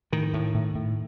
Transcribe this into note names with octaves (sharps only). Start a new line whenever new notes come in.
A2 D#3
A2
A2
A2